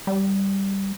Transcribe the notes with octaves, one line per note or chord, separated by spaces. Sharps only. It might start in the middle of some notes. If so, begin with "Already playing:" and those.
G3